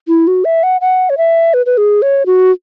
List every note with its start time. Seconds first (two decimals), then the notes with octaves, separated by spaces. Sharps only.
0.08 E4
0.27 F#4
0.45 E5
0.63 F#5
0.81 F#5
1.10 C#5
1.18 E5
1.54 B4
1.66 B4
1.77 G#4
2.02 C#5
2.26 F#4